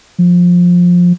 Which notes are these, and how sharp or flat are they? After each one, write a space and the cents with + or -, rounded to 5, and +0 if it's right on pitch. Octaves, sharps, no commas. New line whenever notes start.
F3 +15